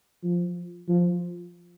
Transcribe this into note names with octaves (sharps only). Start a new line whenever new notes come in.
F3
F3